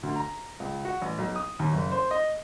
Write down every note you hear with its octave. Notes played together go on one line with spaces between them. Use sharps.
D2
A#5
C#2
F#4
A1
B1
D#6
D#2
F#1
C5
D#5